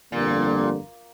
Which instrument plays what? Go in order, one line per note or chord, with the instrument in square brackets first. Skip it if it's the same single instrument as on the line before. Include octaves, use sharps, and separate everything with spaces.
[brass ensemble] G1 F2 D3 G3 A#3 [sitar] A#2